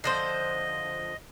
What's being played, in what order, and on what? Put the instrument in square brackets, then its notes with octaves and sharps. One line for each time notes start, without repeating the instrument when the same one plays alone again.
[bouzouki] D3 F3 C5 [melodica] D#5